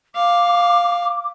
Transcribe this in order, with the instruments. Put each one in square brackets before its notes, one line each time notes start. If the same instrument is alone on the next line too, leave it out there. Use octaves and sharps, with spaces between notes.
[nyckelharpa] F5 [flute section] D6